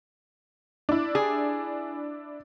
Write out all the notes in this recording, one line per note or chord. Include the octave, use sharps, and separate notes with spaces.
D4 E4
G#4